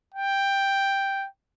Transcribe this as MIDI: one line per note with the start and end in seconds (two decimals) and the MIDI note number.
0.14 1.27 79